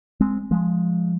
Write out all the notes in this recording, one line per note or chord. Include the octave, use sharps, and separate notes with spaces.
G#3 C4
F3 G#3